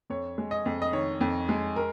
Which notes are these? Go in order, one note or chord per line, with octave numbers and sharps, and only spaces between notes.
F2 C#5
G#3
D#5
F2
D#5
D#3 C#5
F2
G#3
A#4